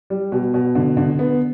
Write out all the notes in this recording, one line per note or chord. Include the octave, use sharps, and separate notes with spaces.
G3
B2
B2
D3
D3
B3